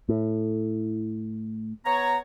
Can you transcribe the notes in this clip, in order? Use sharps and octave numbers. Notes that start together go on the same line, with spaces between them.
A2
B3 C#5 A#5